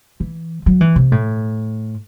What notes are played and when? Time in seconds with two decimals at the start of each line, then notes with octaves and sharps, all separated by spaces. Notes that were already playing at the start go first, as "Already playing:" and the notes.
0.20 E3
0.66 F#3
0.81 E3
0.96 C3
1.12 A2